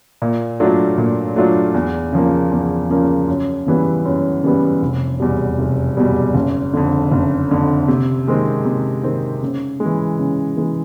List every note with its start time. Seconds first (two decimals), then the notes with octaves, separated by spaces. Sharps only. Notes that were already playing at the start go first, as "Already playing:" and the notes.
0.22 A#2
0.60 F#3 A3 D4 F4
0.98 A#2
1.36 F#3 A3 D4 F4
1.74 E2
2.12 C#3 F3 A#3
2.52 E2
2.90 C#3 F3 A#3
3.28 F#2
3.66 C#3 E3 G3 B3
4.05 F#2
4.44 C#3 E3 G3 B3
4.82 F1
5.20 E2 B2 G3
5.58 F1
5.97 E2 B2 G3
6.35 F#1
6.74 F2 D3
7.11 F#1
7.51 F2 D3
7.88 C3
8.28 D#3 G#3 C4
8.65 C3
9.03 D#3 G#3 C4
9.43 C#3
9.80 G#3
9.85 E3
10.19 C#3
10.57 E3 G#3